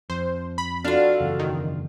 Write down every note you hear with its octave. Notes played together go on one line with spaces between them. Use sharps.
F2 C5
B5
D4 F4 F#4 A4 F5
F#1 E2 C#3
D#3